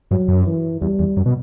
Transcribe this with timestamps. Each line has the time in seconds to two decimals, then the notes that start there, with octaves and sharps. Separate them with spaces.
0.11 G2 F#3
0.28 F#2
0.46 E3
0.81 E2 G3
0.99 E2
1.17 F#2
1.26 B2